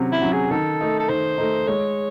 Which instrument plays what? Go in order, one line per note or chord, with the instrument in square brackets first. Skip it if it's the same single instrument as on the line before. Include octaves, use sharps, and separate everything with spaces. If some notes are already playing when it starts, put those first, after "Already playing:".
Already playing: [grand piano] C3 F#3 C#4
[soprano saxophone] E4
[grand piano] F#3 C#4
[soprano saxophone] G#4
[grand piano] D#3 [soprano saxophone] A4
[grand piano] A3 D#4
[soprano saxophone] A4
[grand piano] D#3 [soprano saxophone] C5
[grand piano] A3 D#4
[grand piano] G#3 [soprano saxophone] C#5